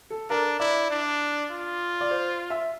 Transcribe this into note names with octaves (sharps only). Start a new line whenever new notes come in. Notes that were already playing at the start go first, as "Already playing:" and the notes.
A4
D4 A#4
E4 D5
D4
F4
D5
C5
E5